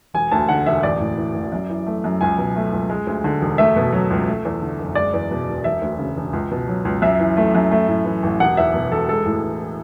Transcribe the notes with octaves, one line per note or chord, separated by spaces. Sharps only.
E1 G#5
D2 A5
D3 F#5
E1 E5
A1 D5
A2
E3
A1
F#2
E3
A3
F#2
C#2 G#5
B2
A3
C#2
G#3
D2
D3
E1
A3 E5
B2
F#3
C#2
A3
E2
D3
F#1
G#3 D5
E2
B2
E1
E1 E5
D2
C#3
E1
C#2
B2
F#3
C#2
F#2 E5
E3
A3
F#2
A3
A2
E3
A1
E1 F#5
E2 E5
B2
E1 A4
G#3 A4
A2
E3